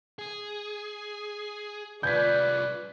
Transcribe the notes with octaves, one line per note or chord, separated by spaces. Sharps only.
G#4
C2 F4 B4 D5 G6 G#6 B6